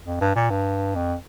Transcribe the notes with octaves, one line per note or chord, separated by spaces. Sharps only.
F2
G2
A#2
G2
F2